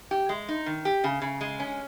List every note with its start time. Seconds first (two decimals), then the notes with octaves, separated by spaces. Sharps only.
0.11 G4
0.29 G#3
0.49 D#4
0.66 D#3
0.85 G4
1.04 C#3
1.22 C#3
1.41 G#3
1.60 C#4